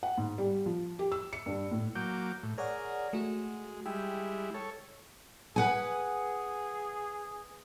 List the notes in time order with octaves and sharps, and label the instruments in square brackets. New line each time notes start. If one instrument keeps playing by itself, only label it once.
[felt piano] F#5
G#2
G3
F3
G4
E6
C#7
G2
A2
[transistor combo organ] F#3 A#3 D6 [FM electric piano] G6
[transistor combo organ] A2
[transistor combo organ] G#4 A#4 [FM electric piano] C#5 D5 F#5
[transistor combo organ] G#3 [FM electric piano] A3 F#4
[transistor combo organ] G3 G#3 E4 [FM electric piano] G5
[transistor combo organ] A4 C#5
[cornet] G#4 [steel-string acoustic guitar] B4 F#5 G#5